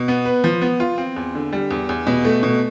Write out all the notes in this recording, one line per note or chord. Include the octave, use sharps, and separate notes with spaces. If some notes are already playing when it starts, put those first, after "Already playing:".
Already playing: B2
B3
B4
F3
B3
F4
C4
E2
D3
G3
E2
E2
B2
A3
B2